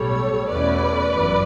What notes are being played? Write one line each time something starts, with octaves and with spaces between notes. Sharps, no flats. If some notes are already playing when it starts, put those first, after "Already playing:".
Already playing: B1 A2 G3 A4 C#5
E2 B2 A3 C#4 B4 D5
G1 F#2 E3